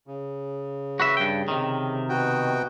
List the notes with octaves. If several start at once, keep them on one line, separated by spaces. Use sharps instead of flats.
C#3
F#4 B4 E5
G2 G5
C3 D#3
B2 F#4 G5